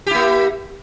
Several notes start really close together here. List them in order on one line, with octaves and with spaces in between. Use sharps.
G4 E4 A#3